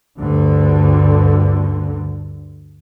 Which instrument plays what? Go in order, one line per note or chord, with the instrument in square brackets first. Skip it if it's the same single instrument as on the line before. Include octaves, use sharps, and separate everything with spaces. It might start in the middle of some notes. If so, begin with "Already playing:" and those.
[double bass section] D2 G2 D3